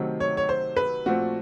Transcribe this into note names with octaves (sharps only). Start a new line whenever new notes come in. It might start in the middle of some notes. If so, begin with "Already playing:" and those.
Already playing: C3 D#3 F#3 A3 C4
C#5
C#5
C5
B4
A#2 F3 A3 C4 F#4